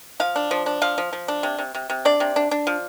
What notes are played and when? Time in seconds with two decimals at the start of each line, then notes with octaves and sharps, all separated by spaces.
0.20 F3 F5
0.36 D4
0.51 F3
0.66 D4
0.82 F3 F5
0.98 F3
1.13 F3
1.28 D4
1.43 C3
1.59 C3
1.75 C3
1.90 C3
2.05 D4 D5
2.20 C3
2.36 D4
2.51 D4
2.67 F3